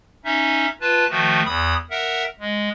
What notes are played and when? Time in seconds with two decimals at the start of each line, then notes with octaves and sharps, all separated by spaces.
0.25 C#4 D#4 E5
0.81 F4 B4 A5
1.10 D#3 F3 A3 F#4
1.45 E2 B5 D#6
1.90 A#4 E5 F#5
2.40 G#3